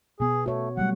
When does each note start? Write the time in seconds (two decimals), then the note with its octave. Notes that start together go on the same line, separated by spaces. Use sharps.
0.20 B2 B3 G#4
0.46 A3 F#4 C#5
0.77 F#3 G3 A3 F#5